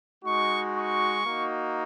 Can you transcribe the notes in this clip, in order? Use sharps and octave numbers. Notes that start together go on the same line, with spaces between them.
G#3 D#4 F#4 C#6
C#6
A#3 D#4 F#4